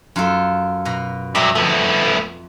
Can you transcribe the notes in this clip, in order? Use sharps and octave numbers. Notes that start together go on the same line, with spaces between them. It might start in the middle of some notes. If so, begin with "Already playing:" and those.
F#2 F4 A4
B2 A#5
G2 F#3 D#5 E5
F2 A3 B3